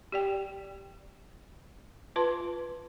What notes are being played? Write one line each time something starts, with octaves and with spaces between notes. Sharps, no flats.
G4 D5 G5
F4 B4 A5 C6